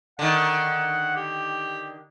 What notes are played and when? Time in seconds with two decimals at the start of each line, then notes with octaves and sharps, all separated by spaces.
0.19 D3 D#3 F#5
1.16 G4